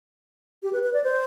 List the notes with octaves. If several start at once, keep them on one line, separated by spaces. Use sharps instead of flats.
G4
B4
B4
D5
C5